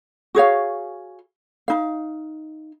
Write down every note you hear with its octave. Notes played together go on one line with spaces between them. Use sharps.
F#4 G#4 C#5 F5
D#4 F5